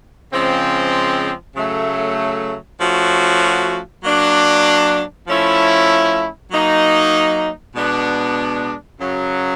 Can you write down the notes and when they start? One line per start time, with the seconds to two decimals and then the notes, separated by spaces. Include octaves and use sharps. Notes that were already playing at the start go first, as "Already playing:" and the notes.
0.32 C#3 F3 G#3 C4
1.56 C#3 F#3 A3
2.80 F3 A3 C#4 F#4
4.04 F#3 A#3 D4
5.27 F3 A3 C#4 E4
6.51 F#3 A#3 D#4
7.75 B2 G#3 B3 D4
8.99 F#2 C#3 F#3